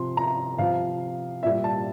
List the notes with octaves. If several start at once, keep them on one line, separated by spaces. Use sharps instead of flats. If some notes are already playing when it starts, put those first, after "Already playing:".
Already playing: C3 F3 C6
A#5
C3 F3 F5
A#2 G3 E5
A5